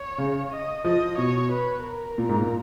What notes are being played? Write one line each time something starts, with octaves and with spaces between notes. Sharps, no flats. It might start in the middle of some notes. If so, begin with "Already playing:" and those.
Already playing: C#5
C#3
D#5
F3 D#5
B2 C#5
B4
A#4
A#2
G#2
A#2